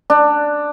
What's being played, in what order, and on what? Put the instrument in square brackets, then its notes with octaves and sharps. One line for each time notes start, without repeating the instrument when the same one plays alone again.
[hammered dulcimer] D4